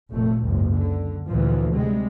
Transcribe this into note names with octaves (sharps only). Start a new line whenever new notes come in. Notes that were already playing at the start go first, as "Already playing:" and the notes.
F1 A#2 A3
F#1 C#2 G#2
D3
D2 A#2 E3 F3
C3 G3 G#3